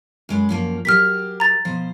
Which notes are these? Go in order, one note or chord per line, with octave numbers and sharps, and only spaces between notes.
F#2 G#3 B4
F#2 F3 A#3
F#3 G4 A#4 F6 B6
A#5 A6
B2 F3 C5